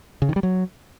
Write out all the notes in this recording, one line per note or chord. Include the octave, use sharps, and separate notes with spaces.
C#3
D#3
G3
F#3